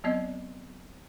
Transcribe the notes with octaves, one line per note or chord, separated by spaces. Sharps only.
F#3 B3 C4 D5 D#5